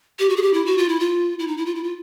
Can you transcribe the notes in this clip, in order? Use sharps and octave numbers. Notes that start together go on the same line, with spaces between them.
G4
F#4
G#4
G4
E4
F#4
F4
E4
F4
E4
D#4
E4
F4
E4
F4